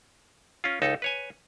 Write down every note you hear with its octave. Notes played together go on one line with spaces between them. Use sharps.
C#4 F4
C#2 D#4 A4
B4 C#5 G#5